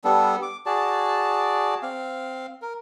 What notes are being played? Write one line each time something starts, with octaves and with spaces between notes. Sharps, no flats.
G3 B3 D4 A4
D6
F#4 G#4 D5 A5
C4 F5
A#4